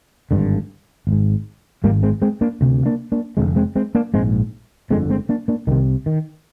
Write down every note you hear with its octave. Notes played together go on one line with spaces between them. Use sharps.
G#1 G2 D3
G#1 G#2
G#1 G#2 G3 A#3
G#3 C4
G#3 C4
A#3 D4
D2 C3
A#3 D4
A#3 D4
F1 D#2 D3 G#3 C4
G#3 C4
G#3 C4
A#3 D4
A#1 G#2 G#3 C4
G1 F2 D3 G#3 C4
G#3 C4
A#3 D4
A#3 D4
C2 C3 D#3
D#3